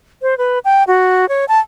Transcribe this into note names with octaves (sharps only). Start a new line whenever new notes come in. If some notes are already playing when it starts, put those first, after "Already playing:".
C5
B4
G5
F#4
C#5
A5